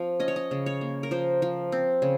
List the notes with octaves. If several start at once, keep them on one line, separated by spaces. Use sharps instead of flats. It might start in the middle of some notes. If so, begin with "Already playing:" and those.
Already playing: F3 C4 F5
C#4 D#5
C#5
D#5
C#3
C#5
A#3
A#4
F3 C5
F3
C4
C#3